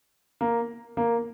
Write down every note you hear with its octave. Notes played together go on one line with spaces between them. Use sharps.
A#3
A#3